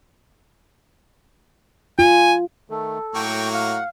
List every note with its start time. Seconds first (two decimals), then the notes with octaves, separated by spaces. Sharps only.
1.99 F4 G#5
2.70 D#3 A3 A4
3.15 A2 F#3 A#3 F#4 G5 C#6
3.53 F5 F#5